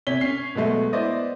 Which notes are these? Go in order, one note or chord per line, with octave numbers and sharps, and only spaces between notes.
C3 C#5 B6 G7
C#4 C7
B2 F#3 G#3 A3
B3 E4 C5 D5 D#5